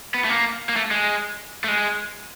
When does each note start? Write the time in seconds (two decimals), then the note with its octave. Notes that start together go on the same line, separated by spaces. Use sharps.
0.14 B3
0.25 A3
0.29 A#3
0.69 A#3
0.76 A3
0.91 G#3
1.64 A3
1.68 G#3